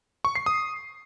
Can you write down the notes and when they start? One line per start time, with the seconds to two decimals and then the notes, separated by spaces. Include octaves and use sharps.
0.25 C#6
0.35 C7
0.46 D#6